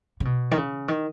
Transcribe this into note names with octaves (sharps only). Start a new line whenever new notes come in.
C#3
B2
D#3
C#3
D#3